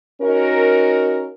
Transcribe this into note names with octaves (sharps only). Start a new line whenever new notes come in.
C#4 D#4 F#4 A#4